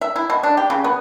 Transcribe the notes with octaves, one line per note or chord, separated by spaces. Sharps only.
E5
E4
B2
D4
G4
C#3
B3